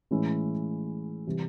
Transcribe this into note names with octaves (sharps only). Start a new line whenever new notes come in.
A2 E3 G#3 C#4 E4
C3 E3 G3